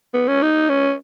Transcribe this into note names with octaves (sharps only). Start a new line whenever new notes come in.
B3
C#4
D#4
C#4